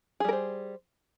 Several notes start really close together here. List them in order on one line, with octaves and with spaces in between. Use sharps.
G#4 G3 A#4 C5